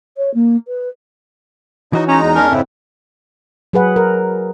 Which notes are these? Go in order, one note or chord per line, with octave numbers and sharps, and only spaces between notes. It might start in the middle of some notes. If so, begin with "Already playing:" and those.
C#5
A#3
B4
E3 D#4 F#4 C#5 D#5
G#3 C#4 D#4 A#5
E2
C#4 D4 A#4
F2 G#2 C#3 E4
F#3 G#4 B4 F#5
A#4